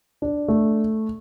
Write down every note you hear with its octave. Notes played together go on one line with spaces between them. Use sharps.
D4
A3